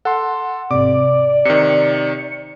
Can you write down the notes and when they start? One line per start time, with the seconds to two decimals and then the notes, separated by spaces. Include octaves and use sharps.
0.05 A4 F#5 C6
0.71 G#1 C3 D5 D6
1.45 C3 D#3 C#7